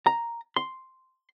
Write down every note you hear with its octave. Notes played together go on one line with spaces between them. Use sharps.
A#5
C6